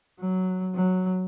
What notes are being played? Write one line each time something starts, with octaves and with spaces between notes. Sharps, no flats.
F#3
F#3